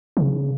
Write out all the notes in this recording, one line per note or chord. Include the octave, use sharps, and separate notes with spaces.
D#3
C#3